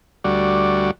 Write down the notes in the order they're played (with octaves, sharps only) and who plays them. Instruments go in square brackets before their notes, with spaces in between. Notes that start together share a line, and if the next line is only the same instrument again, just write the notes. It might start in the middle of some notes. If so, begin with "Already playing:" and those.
[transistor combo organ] D2 G3 F#4 D5